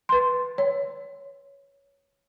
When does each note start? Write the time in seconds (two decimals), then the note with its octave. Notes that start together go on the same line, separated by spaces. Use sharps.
0.09 B4 C6
0.58 C#5